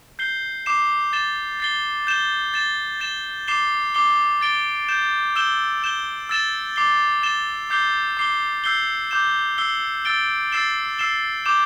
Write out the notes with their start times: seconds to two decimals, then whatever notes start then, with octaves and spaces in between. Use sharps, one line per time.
0.19 G6 C7 G7
0.66 D6 C7 E7
1.13 A6 E7 G7
1.60 A6 C7 G7
2.07 G6 E7 G7
2.54 A6 E7 G7
3.01 A6 E7 G7
3.48 D6 C7 E7 G7
3.95 D6 C7 G7
4.41 A6 D7 G7
4.89 G6 E7 G7
5.36 E6 G6 E7 G7
5.82 G6 E7 G7
6.29 E6 A6 E7 G7
6.76 D6 C7 G7
7.23 A6 E7 G7
7.70 D6 G6 C7 G7
8.17 D6 C7 G7
8.64 E6 G6 C7 G7
9.11 D6 G6 E7
9.58 E6 C7 G7
10.05 E6 A6 D7 G7
10.52 E6 A6 C7 E7 G7
10.99 E6 C7 E7 G7
11.46 D6 G6 E7 G7